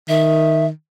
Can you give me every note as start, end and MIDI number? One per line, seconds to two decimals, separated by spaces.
0.09 0.69 51
0.09 0.66 76